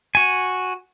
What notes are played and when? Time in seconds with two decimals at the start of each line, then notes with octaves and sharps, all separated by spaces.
0.15 F#4 G#5